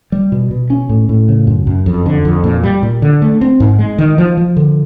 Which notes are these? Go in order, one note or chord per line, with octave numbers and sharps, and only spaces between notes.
G3
B2
B2
C#4
A2
A2
C#3
F#2
F#2
F2
D3
F2
A#2
G3
A#2
D3
A3
C4
G#2
G#3
D#3
F3
F3
D3